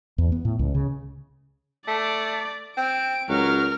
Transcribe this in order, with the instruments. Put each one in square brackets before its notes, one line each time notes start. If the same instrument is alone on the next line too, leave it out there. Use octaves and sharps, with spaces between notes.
[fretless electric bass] E2
B3
A2
C#2
C#3
[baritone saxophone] A3 [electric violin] D5
[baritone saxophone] C4 [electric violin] D7
[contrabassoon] C#2 [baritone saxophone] F#3 [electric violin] A#4 F6